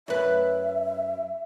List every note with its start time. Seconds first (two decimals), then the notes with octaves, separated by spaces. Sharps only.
0.08 F#2 B4 E5